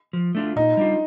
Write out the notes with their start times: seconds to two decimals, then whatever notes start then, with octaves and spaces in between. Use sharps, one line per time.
0.13 F3
0.35 A3 D4 F4
0.56 A#2 D#4
0.77 G3 D4 F4